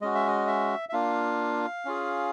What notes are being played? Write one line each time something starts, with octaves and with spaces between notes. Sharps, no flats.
G#3 C#4 F#4 D#5
E5
D#5
E5
E5
A#3 D4 F4 F5
C#4 F4 G#4